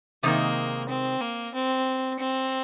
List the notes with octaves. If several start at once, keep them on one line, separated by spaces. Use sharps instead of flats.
C3 D#3 G#3 A#3 D#4
C4
A#3
C4
C4